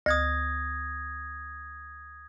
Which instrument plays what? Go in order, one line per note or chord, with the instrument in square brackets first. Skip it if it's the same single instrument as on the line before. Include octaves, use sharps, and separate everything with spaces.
[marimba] D2 [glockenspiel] D#6 G#6 A#6